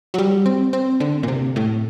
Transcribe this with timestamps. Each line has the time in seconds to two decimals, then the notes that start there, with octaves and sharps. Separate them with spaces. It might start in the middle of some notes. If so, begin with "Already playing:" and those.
0.14 F#3
0.18 G3
0.46 C4
0.73 C4
1.00 D3
1.23 A#2
1.28 C3
1.56 A2